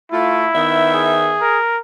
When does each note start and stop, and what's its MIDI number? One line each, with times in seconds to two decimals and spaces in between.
0.12 0.46 57
0.12 1.15 64
0.12 0.46 65
0.55 1.36 51
0.55 1.36 59
0.55 1.52 76
0.94 1.58 68
1.41 1.79 70